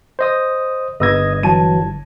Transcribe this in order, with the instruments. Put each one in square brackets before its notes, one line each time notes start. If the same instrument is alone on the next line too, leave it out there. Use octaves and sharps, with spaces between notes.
[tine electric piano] C5 D#5 D#6
[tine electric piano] G1 G#6 [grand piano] B4 E6 A#6 [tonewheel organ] D#5
[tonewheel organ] E3 F#3 [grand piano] A5 D#7